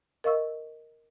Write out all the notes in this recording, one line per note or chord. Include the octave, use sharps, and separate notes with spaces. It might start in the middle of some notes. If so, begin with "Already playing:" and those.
A#4 D#5 F5 C#6 E6